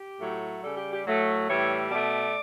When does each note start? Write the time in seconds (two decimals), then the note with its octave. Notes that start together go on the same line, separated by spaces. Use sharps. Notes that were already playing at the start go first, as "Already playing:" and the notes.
Already playing: G4
0.19 A2 F#3 A3
0.62 C#3 G3 A4
0.76 G4
0.91 G4
1.05 A2 F#3 A3
1.47 A2 E3 G3 C#5
1.90 B2 A3 D5